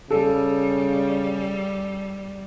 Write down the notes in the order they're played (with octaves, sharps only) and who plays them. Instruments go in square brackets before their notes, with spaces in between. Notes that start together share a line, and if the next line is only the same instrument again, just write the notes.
[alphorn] C#3 [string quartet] G3 [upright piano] A4